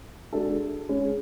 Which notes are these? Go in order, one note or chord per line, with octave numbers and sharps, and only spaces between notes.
G#3 D4 F#4 A4
G#3 C#4 G#4